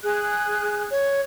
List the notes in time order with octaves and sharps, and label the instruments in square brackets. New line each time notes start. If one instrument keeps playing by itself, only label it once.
[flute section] G#4 F#6
[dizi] C#5